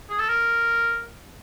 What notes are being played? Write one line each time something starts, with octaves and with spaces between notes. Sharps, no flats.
G#4
A4
A#4